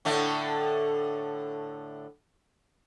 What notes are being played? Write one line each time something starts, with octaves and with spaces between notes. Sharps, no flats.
A2 D3 A3